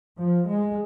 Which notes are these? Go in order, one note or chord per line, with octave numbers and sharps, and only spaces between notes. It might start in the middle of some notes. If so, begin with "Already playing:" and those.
F3
G#3